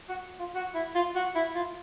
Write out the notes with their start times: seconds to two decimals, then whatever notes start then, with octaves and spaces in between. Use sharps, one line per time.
0.09 F#4
0.39 F4
0.55 F#4
0.75 E4
0.95 F4
1.15 F#4
1.35 E4
1.55 F4